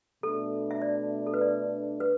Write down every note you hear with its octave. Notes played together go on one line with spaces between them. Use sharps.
B2 A3 D4 A4
E5
D5
A4
B4
D5
B4